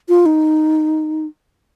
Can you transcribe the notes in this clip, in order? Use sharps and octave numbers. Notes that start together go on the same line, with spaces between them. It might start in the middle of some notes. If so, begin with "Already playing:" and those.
F4
D#4